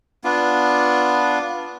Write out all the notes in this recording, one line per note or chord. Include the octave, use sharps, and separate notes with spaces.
B3 D4 F4